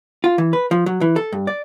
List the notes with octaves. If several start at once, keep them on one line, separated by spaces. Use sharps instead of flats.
F4
E3
B4
F3
F#3
E3
A4
G2
D5